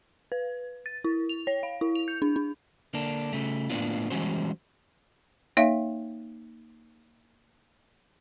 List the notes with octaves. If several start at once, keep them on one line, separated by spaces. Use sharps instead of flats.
B4
A6
E4
F7
C#5
F5
E4
F7
G6
D4
D4
D3 A#3 D4
C#3 A3
A2 A#3 B3 D4 F4
E3 G3 G#3 C#4 F#4 C5
A#3 D#4 C#5 E5 F5